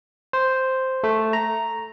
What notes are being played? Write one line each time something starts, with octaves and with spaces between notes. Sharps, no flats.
C5
A3
A#5